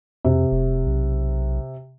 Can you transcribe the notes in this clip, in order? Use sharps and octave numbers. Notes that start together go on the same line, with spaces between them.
F2 C3
F1
B1